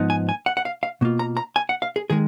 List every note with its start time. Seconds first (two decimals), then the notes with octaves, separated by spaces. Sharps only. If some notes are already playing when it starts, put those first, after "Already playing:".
Already playing: G#2 F3 B3 D#4
0.10 G#5
0.29 G#5
0.46 F#5
0.57 F#5
0.65 F5
0.83 F5
1.01 B2 A#3 F4
1.19 A#5
1.37 A#5
1.56 G#5
1.69 F#5
1.82 F5
1.96 G#4
2.10 D#3 G#3 G#4